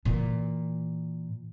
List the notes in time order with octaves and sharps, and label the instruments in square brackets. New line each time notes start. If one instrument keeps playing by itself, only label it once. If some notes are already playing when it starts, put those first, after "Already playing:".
[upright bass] A#2 E3